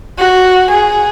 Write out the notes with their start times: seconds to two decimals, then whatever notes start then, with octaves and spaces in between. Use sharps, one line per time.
0.19 F#4
0.70 G#4